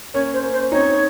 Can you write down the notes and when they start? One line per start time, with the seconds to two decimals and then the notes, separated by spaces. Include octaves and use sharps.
0.14 A#3 C#4 C#5
0.34 C5
0.42 A#3 C#4
0.53 C5
0.72 C4 D#4 C#5